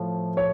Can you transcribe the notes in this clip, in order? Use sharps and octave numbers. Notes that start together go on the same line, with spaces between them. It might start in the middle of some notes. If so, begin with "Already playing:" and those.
Already playing: A2 F3 A3
A2 C#5